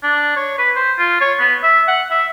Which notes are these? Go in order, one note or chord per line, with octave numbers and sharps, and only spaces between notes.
D4
C#5
B4
C5
F4
C#5
B3
E5
F#5
E5